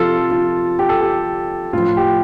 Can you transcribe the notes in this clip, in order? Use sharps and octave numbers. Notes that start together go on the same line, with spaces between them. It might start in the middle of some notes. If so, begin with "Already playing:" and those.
Already playing: C3 F3 F4 A4
F4
G4
A4
G4
A2 F3 F4
G4